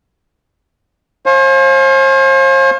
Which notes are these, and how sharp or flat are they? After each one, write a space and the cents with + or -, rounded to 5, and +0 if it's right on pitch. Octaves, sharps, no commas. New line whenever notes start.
C5 +45 F5 +0 G#5 +40